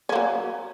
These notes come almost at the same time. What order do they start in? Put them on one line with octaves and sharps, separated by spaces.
C#4 A#3 F#3